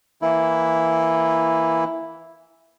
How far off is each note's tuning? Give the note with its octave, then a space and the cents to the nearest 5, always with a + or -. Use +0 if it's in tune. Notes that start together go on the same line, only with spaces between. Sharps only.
E3 +0 A#3 +0 E4 +0